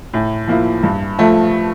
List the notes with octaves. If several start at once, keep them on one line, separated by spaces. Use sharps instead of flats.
A2
F3 A#3 E4
G2
F3 A3